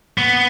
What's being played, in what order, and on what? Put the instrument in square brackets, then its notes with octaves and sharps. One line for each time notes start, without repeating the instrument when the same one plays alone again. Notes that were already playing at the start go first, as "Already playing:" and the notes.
[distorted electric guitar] B3